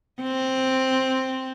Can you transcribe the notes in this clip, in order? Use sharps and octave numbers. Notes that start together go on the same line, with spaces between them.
C4